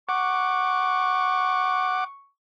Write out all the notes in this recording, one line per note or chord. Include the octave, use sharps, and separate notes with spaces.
F#5 C#6 D6